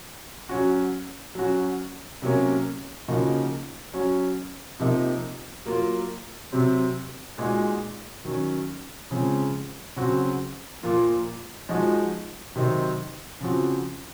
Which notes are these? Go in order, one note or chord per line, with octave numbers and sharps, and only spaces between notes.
F#3 C#4 F#4
F#3 C#4 F#4
C3 F#3 A#3 C#4
C#3 F3 A#3 D#4 F#4
F#3 C#4 F#4
C3 F3 A#3 D#4
F#3 A#3 F4
C3 F#3 C4
A#2 G#3 D#4 F#4
D#3 F#3 C#4
C#3 F3 G#3 C4
C#3 F#3 C4 F#4
A#2 F3 A#3 F4
F3 G#3 D#4 F#4
C3 D#3 F#3 C4 D#4
C#3 F3 C4 F#4